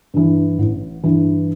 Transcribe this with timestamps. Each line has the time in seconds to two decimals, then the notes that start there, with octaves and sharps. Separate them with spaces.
0.14 G2 E3
0.58 A1
1.03 G2 E3